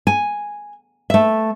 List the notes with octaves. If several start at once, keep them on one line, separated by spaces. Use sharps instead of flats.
G#5
A3 E5